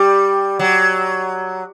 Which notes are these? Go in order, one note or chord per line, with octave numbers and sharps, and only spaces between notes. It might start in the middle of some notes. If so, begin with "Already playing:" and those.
Already playing: G3
F#3